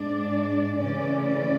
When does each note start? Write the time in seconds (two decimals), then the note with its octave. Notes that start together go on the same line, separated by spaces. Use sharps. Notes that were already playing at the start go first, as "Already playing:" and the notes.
Already playing: G#2 G#3 D4 D5
0.79 C#3 E3 A3 C#4 D5
1.28 D5